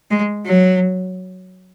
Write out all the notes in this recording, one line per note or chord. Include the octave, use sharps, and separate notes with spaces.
G#3
F#3